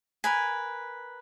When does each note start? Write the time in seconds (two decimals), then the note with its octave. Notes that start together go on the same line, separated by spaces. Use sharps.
0.24 A#4 B4 G#5